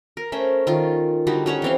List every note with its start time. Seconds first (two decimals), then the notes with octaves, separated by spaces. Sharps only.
0.17 A#4
0.32 A3 C#4 A#4 C5
0.67 D#3 F4
1.27 D3 G3 D#4 F#4
1.46 G3 C#4 C#5 F#5
1.62 E3 C4 F5